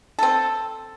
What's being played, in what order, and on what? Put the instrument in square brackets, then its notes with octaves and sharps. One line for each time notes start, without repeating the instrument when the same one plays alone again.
[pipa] C4 A4